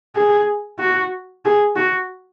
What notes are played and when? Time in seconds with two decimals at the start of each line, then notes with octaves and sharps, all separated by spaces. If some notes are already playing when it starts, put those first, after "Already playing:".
0.16 G#4
0.80 F#4
1.45 G#4
1.76 F#4